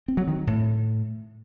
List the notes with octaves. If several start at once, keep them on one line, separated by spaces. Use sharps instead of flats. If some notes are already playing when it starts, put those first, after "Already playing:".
C4
F#3
D#3
A2